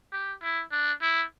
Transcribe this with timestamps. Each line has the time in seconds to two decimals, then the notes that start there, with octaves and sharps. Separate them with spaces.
0.12 G4
0.42 E4
0.72 D4
1.02 E4